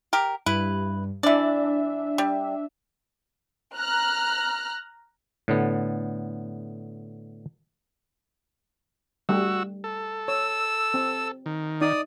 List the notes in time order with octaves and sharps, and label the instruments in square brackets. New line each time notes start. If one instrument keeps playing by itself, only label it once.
[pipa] G4 A#4
[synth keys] G2 [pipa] E4 B4
[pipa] E3 D5 [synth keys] D4 E5
[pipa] G3
[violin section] A#5 F6 F#6
[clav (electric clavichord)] A2 D3 B3
[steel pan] G3 A3 G4 [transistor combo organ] F#4 E6
[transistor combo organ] A4
[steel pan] C#5 [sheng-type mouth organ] E6
[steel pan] C4
[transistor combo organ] D#3
[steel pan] D#4 [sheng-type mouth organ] D5 D#6